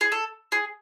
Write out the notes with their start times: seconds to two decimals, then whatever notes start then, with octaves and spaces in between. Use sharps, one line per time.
0.01 G#4
0.12 A4
0.52 G#4